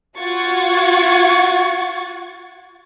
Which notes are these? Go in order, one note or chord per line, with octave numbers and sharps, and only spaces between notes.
F4 F#4 F#5 C#6 G#6 A6